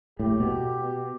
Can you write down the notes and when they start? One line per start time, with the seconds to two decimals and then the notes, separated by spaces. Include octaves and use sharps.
0.19 A2 G4
0.40 B2